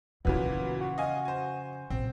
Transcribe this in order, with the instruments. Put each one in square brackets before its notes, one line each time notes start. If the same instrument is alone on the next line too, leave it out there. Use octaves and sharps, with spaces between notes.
[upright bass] F2 C#3 [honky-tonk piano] A#2 E3 F#3 [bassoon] B3
[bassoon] F#4
[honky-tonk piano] D#5 F5 G#5
C5 G#5
[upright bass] A#1 [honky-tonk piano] C4